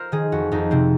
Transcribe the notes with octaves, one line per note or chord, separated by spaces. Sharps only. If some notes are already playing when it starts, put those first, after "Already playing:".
Already playing: F4 A#4 C5
D#3 G#4
F2 F#4
F2 D#4
C3 C4